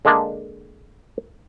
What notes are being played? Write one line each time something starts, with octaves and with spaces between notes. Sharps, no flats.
D3 G#3 A#3 D4